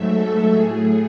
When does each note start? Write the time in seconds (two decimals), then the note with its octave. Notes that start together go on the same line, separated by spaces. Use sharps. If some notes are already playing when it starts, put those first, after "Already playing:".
Already playing: G#2 F#3 A3 E5
0.10 A4
0.52 A2 F#3 A3 G#4